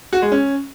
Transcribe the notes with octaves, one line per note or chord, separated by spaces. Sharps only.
F#4
G#3
C#4